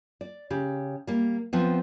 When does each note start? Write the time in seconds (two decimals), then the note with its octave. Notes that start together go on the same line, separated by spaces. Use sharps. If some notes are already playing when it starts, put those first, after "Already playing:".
0.21 D5
0.50 C#3 G4
1.07 G3 A#3
1.53 F3 B3 C4